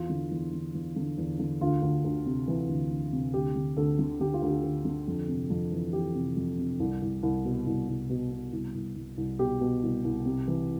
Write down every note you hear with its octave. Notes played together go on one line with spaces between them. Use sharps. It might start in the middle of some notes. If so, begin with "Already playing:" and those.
Already playing: E2 F4
D3
E2
D3
E2
D3
E2
D3
D2 F4
D2
D2
C3
E3
D2
D2
C3
D2 G4
D3
D2 A4
D3
D3 G4
F4
D2
G4
D2
D3
F2
C3
F2
E3
E3 G4
C3
F2
C3
C2
C2
C2
B2
C2
C2
B2
B2
C2
C2
C2
C2
B2 G4
B2
C2
C2
C3
E3